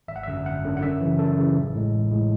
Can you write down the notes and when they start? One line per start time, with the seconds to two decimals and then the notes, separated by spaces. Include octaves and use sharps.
0.08 G#1 E5
0.16 F#5
0.23 F#2 D3 E5
0.46 G#1 F#5
0.64 F#2 D3
0.77 F#5
0.82 F#2 E5
1.00 C#3 E3
1.19 F#2 A4
1.38 C#3 E3
1.56 A1
1.75 A2 G#3
1.93 A1
2.11 A2 G#3